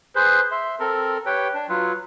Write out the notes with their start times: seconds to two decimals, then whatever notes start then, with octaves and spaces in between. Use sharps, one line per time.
0.16 G#4 B4 C5
0.52 E5 C6
0.80 C4 A4 A#4
1.26 G4 B4 C#5 G5
1.54 D4
1.69 F#3 F4 B4